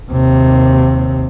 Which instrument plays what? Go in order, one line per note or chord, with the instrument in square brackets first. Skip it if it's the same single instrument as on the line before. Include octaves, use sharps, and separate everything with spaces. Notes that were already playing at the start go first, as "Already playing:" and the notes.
[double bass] D#2 C3